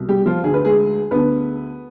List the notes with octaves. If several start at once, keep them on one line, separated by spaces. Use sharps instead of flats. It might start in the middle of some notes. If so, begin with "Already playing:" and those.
Already playing: C2 B2
G3 G4
F3 F4
D2 D3 G#4
B4
G#3 G#4
D2 D3 B3 B4